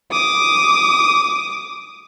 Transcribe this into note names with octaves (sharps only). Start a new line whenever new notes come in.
D6 D#6